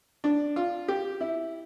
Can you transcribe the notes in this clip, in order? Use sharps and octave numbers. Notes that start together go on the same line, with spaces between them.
D4
F4
G4
E4